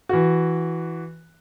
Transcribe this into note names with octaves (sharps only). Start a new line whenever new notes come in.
E3 F#4